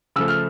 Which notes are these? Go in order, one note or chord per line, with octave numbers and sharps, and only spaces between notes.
C#3 F3 A3 E6
F6